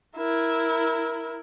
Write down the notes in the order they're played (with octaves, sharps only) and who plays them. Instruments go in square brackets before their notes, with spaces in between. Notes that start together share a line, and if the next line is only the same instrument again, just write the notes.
[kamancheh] E4 A#4